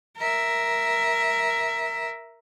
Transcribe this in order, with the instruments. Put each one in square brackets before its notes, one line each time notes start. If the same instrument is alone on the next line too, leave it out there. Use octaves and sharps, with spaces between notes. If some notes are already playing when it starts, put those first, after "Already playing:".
[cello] A#4 E5